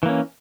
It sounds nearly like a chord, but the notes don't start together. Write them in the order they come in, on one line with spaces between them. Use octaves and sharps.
E3 A#3 C#4